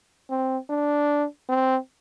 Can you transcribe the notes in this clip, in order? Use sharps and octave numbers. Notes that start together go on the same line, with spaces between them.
C4
D4
C4